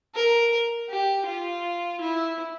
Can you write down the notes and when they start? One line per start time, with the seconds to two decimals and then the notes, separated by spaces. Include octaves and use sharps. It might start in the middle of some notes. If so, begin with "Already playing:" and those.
0.15 A#4
0.89 G4
1.26 F4
2.01 E4